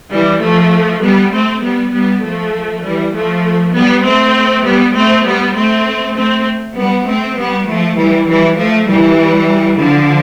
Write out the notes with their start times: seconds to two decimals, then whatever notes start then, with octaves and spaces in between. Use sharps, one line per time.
0.12 E3 G3
0.42 F3 A3
1.03 G3 B3
1.33 A3 C4
1.62 G3 B3
1.93 G3 B3
2.24 F3 A3
2.83 E3 G3
3.14 F3 A3
3.75 G3 B3
4.05 A3 C4
4.65 G3 B3
4.95 A3 C4
5.25 G3 B3
5.56 A3 C4
6.16 A3 C4
6.76 G3 B3
7.07 A3 C4
7.37 G3 B3
7.67 F3 A3
7.97 E3 G3
8.28 E3 G3
8.58 F3 A3
8.88 E3 G3
9.79 D3 F3